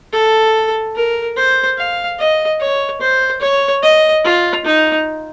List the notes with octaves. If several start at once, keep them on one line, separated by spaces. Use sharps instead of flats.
A4
A#4
C5
F5
D#5
C#5
C5
C#5
D#5
F4
D#4